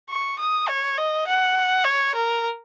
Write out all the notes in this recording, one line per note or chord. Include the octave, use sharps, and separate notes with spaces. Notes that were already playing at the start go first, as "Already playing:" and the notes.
C#6
D#6
C#5
D#5
F#5
C#5
A#4